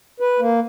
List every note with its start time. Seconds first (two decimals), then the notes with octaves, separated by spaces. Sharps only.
0.20 B4
0.39 A#3